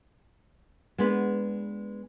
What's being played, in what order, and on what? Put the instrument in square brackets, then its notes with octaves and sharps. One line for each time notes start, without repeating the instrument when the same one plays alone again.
[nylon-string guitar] G#3 B3 D4 B4